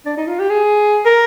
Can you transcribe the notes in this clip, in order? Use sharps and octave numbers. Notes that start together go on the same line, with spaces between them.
D4
D#4
F4
G4
G#4
A#4